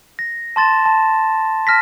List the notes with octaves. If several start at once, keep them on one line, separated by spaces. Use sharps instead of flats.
A#6
A5 C6 A6 E7
A5
A5 F6 A#6 B6